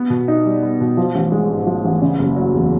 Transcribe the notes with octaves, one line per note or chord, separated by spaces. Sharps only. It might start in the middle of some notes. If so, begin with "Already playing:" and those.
Already playing: B3
B2
D#4
G3
B3
B2
F3
A1
G#3
G#2
F3
A1
C#3
F#1
F#3
E2